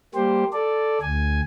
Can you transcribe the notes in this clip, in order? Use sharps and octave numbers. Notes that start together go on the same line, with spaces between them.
G3 A#3 G4 C5
A4 D5
D2 G#5